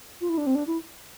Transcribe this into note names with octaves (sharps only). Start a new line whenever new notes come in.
F4
E4
D4
C4
D4
E4